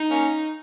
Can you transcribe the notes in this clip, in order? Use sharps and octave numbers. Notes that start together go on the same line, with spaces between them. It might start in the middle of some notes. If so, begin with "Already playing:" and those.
Already playing: D#4
A#3 C#4